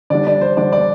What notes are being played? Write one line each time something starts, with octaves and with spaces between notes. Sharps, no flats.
D3 G3 D4 D5
D5
C5
D3 G3 D4 D5
D5